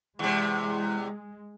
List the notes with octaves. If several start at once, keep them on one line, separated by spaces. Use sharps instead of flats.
E2 C3 G#3